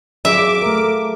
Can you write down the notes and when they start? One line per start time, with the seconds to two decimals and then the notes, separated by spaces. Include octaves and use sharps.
0.25 F#3 G#4 E5 F5 D6
0.62 A3 A#4